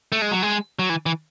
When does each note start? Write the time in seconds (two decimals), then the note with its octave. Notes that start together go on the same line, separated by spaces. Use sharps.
0.12 A3
0.22 G#3
0.31 F#3
0.42 G#3
0.79 F#3
0.90 E3
1.06 E3